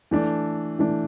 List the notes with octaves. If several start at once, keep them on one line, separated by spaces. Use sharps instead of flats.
E3 A3 D4
E3 A3 D4